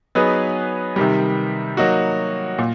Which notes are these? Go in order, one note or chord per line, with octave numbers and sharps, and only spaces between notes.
F#3 B3 D#4 G#4 B4
C3 D#3 G3
F#3 A#3 D#4 F#4
A#2